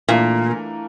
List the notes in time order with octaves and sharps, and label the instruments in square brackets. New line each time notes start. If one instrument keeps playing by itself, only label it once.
[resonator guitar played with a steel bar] A#2 [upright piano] E3 A3 D4 F4 A#4